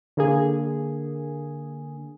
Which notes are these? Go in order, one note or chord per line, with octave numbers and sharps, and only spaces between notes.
D3 A#3 G#4